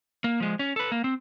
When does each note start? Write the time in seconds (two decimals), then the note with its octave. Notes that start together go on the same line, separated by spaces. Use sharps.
0.24 A#3
0.40 F3 G#3
0.59 C#4
0.76 A4 B4
0.92 A#3
1.04 C4